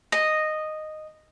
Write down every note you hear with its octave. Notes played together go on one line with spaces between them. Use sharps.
D#5